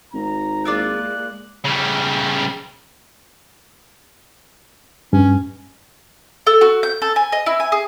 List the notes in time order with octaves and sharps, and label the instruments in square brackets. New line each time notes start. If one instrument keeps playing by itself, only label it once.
[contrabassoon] G#1 [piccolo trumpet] A#5
[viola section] G#3 A#3 [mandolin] E4 F4 D5 [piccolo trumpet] F#6
[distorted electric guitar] C#3 G3
[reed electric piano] G2 [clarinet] C#4
[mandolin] A4
F#4
G6
A4
G#5
D#5
E4
G#5
G#4